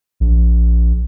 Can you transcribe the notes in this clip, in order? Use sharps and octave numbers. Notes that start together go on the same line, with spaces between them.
A#1